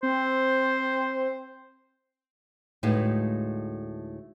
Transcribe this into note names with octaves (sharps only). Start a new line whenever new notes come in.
C4 C5
D2 A2 G#3 D#4 B4 F5